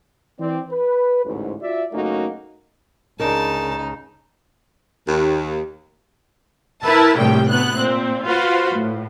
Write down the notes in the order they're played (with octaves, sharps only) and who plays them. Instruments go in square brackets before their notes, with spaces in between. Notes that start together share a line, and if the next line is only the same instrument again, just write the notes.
[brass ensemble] E3 C4 D5
B4
A1 D2 G#2
F4 F#4 D5 E5
F#1 A3 A#3 C#4 D#4 F#4
[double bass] C#2 C#3 [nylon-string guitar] D4 A#4 [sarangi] D#4 [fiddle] A5
[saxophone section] D#2
[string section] E4 A#4 B4 E5 A5
A#1 A2 C3 G3 G5
D2 B3 F#6
A#2 C4
F4 F#4 B4 C5
A2